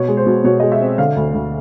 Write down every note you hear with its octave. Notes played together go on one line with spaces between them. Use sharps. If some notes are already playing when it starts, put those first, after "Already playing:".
Already playing: B2 C#5
G#3
C5
B2
B2 C#5
G#3 D#5
E5
C4
D3 F5
D2
D2